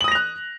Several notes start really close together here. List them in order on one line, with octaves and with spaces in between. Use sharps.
F#7 D#6 A#6 F7 F#6